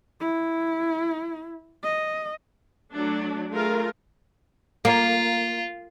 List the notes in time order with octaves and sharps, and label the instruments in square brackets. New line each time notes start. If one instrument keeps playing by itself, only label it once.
[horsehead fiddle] E4
D#5
[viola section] F#3 A3 D4
A3 F4 G#4 A#4
[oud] A#3 [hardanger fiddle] F4